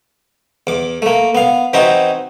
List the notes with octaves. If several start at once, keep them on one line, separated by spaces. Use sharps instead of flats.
E2 D6
A3 A#3
B3 F5
E3 C4 D#4 F#4 G5